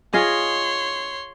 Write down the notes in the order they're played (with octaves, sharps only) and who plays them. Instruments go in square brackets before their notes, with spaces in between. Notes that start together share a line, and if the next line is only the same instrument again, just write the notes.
[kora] F4 G#4 D#5 [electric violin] C#5 C6